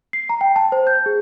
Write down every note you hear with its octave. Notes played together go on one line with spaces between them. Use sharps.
C7
A#5
G5
A5
C5
G6
G#4